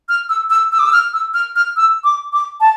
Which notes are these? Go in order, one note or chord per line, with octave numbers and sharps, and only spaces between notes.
F6
E6
E6
E6
D6
E6
F6
E6
F6
F6
E6
D6
D6
A5